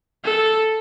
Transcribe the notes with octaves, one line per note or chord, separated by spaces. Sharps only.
A4